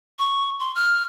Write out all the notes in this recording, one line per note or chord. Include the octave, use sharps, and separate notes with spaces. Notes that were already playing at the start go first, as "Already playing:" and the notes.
C#6
C6
F6